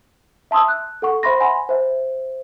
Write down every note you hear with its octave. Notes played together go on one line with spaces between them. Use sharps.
E5 A5 C6 D#6 E6
F#6
A4 F#5 C#6
C5 E5 B5 C6 A#6
F#5 G#5 B5 C6
C5 E5